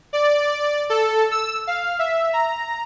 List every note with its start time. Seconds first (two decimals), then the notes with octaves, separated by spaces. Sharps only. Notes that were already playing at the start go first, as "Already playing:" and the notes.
0.13 D5
0.59 D5
0.90 A4
1.31 E6
1.67 F5
1.99 E5
2.33 A#5